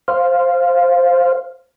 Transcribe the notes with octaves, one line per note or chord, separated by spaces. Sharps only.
C5 F5